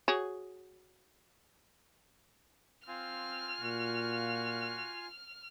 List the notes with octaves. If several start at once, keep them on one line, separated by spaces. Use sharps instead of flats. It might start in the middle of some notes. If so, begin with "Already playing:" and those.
F#4 G#4 C#5
C4 F4 F5 G#5 F6
A#2 F#4